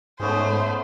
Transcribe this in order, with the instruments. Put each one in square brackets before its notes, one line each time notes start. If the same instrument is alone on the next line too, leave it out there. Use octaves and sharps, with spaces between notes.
[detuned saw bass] G#2 [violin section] A3 [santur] B3 C#4 G#4 [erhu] C5